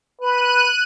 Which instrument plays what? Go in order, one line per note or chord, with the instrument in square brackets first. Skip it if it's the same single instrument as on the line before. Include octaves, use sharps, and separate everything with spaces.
[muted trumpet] B4 [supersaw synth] F#6 D#7